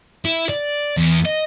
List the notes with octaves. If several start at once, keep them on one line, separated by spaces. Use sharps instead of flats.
E4
D5
E2
D#5